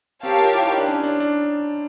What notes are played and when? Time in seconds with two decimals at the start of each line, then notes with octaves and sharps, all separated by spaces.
0.23 C4 G4 A#4 C#5 F5 A5
0.44 F4
0.54 E4
0.66 D#4
0.77 D4
0.88 C#4
1.04 D4
1.20 D4